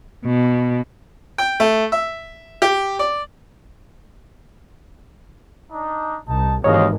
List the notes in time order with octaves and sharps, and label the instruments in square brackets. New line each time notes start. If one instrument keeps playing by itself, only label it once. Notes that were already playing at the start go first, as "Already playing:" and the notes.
[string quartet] B2
[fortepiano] G5
A3
E5
G4
D5
[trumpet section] D4 D#4
[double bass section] C2 [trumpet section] D#4 A5
[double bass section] G#1 E3 G#3 [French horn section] D#2 [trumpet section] A#4 D#5 [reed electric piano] C#5